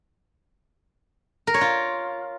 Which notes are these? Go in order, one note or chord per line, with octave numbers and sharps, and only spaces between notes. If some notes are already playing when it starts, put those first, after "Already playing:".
A#4
C#5
F4